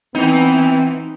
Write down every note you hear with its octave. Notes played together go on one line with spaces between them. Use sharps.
E3 B3 C4 D#4